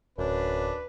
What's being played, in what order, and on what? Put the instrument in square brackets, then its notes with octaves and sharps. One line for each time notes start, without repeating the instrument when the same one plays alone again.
[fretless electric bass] D1 [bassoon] F#2 [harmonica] D4 [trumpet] B4